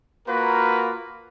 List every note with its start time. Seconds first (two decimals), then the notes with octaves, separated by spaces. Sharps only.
0.27 A#3 F4 F#4 A#4 B4